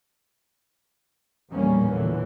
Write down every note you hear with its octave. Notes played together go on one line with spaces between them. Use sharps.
A#1 E2 A2 G3 A#3 C#4
A#2 D3 E3